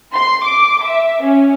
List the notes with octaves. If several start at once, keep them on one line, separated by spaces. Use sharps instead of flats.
C6
D6
E5
C#4